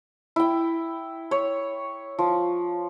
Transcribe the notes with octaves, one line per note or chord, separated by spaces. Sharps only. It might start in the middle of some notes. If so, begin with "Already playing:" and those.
E4 G5
C#5
F3